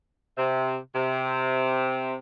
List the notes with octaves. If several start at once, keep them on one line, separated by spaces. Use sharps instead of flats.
C3
C3